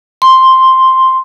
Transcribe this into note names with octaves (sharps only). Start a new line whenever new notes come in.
C6